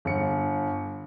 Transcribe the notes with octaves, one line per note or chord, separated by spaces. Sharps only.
G1 C#7